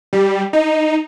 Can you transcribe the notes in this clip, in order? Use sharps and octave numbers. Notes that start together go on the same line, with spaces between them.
G3
D#4